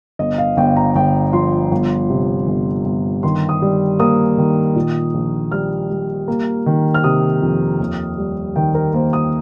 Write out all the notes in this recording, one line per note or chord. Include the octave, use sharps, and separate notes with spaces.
G1 D#5
F5
G1 G5
A#5
G1 G5
F3 C6
G1
C3
G1
G1
D#3 C6
D#6
G3
A#3 D#6
D#3
A#2
A#1
G3 F6
G3
A#3
D#3
F6
C3 D#6
F2
D#2
G3
D#3 G5
A#4
A#3 C5
D#6